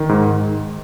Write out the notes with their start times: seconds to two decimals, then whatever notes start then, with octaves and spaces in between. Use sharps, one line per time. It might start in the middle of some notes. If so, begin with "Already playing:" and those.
Already playing: D#3
0.09 G#2